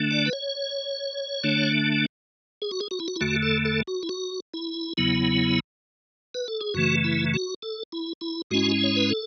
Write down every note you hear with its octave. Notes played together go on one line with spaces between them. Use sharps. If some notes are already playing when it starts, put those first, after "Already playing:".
Already playing: D3 A3 D4
D5
B4
C#5
D3 A3 D4
G#4
F#4
G#4
F#4
E4
F#4
E4
E2 D3 A3 F#4
A4
A4
F#4
E4
F#4
E4
E2 C#3 F#3 B3 E4
B4
A4
G#4
F#2 C#3 E3 A3 F#4
E4
F#4
A4
E4
E4
G#2 G#3 C#4 E4 F#4
C#5
B4
A4